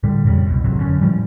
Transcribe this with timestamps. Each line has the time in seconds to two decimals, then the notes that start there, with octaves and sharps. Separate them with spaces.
0.03 A2 D3 G3
0.24 F2 A#2 C#3 G3
0.46 C2 B2
0.64 G#1 A2 C3 F#3
0.78 F1 F#2 D3 C#4
1.01 A2 E3 F3 G3